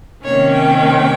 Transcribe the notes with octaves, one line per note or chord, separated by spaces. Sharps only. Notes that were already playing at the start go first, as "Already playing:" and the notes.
C3 D#3 A#3 C#4 C#5
G5